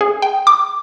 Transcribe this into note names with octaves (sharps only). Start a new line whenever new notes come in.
G#4
G5
D6